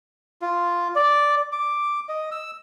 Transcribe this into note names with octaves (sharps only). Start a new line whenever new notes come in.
F4
D5
D6
D#5
E6